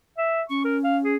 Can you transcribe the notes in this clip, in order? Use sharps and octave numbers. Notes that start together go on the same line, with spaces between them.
E5
C#4 C#6
A#4
F5
G#4